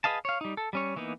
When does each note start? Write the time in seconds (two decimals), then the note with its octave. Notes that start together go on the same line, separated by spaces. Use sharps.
0.04 G#4 B4 D#5 F5 A5
0.25 C#5 F5
0.41 G3 D#4
0.57 A4
0.73 G3 C#4 C#5
0.96 E3 A#3 B3 D#4